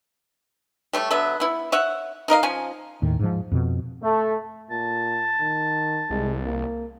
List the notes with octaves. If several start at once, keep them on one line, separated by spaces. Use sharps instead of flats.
G3 A3 C#5
D3 F#3 B3 E5
B3 E4
C#5 E5 F#5
D#4 A#4 D#5 F5
F3 C#4 G#5
D#2 A2 D#3
G#2 F3
F2 B2
A3
A#2 A5
D#3
C2 G#3
A#3